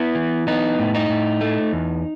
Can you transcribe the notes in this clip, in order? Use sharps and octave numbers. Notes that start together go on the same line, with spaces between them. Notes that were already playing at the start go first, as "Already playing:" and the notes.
Already playing: B3 E4
E3
B3 D#4
A2
D#4
A2
A3
E2